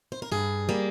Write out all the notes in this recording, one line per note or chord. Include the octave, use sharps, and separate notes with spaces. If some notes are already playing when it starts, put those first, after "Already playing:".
C5
A#4
G2 G#4
G3 A#3